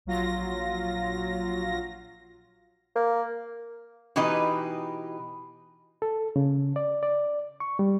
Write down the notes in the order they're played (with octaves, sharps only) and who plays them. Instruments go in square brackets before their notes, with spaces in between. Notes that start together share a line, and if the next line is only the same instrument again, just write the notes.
[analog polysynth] A#1 F#3 F4 A#6
[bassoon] A#3
[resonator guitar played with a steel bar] B2 E3 D#4 G4 B4 D#5
[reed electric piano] A4
C#3
D5
D5
C#6
G3